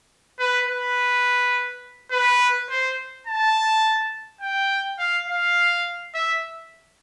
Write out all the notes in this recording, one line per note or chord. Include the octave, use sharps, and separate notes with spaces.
B4
B4
B4
C5
A5
G5
F5
F5
E5